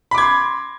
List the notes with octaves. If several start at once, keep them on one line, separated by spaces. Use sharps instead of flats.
B5 C6 D6 G#6